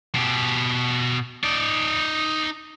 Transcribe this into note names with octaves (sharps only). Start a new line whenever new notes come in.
B2 G4
D#4 D5